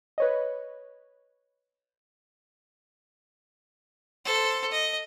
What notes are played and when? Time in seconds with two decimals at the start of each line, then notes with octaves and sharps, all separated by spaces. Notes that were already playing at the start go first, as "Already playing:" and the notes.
0.18 B4 C#5 D#5
4.25 A4 C5
4.71 D#5